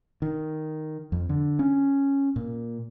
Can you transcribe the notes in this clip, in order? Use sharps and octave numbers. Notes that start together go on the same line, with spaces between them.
D#3
F2
D3
C#4
A#2